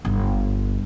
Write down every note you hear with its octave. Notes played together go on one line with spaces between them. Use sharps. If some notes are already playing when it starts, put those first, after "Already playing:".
G1